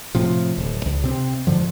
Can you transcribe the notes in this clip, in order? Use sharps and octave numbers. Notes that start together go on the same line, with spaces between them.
A2 C3 F3
D1
C#2
C3 C4
G#2 D3 F3